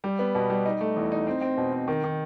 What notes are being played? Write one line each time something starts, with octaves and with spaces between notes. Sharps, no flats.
G3
B3
B2
G3
D#4
A3
E2
D#4
C4
C4
B2
C4
D#3
D#3